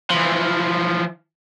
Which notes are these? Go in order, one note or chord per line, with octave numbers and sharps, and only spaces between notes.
E3 F3